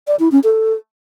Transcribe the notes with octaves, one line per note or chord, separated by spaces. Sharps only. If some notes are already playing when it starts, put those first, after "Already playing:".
D5
E4
C#4
A4